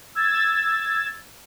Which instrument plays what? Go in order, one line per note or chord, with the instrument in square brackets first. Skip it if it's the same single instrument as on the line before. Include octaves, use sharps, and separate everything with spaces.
[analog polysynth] E6 G#6 A6